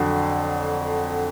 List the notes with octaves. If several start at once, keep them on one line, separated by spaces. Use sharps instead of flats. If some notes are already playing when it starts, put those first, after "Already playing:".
Already playing: F2 D3 F#3